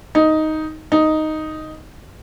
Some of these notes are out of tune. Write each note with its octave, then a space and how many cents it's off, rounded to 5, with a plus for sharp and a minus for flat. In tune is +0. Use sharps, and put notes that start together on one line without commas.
D#4 +5
D#4 +0